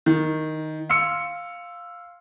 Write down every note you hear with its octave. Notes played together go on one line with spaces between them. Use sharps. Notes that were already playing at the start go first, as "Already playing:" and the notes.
D#3
F5 C6 E6 C#7